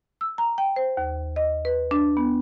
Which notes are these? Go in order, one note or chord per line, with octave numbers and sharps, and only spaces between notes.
E6
A#5
G5
C5
D#2
D#5
B4
D4
B3